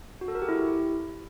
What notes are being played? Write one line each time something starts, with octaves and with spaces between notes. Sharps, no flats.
F#4
A4
A#4
G4
E4